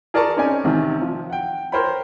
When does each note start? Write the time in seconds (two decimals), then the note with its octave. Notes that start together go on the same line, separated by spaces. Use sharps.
0.14 G#4 A#4 D5 G#5 A5 C#6
0.36 C4 C#4 D#4 D5 G#5
0.64 A1 C3 D#3
1.02 F3
1.30 F#5 G5
1.72 A#4 C5 C#5 G5 B5